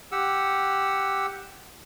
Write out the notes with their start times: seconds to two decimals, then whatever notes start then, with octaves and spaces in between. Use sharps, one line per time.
0.12 G4 F#5 E6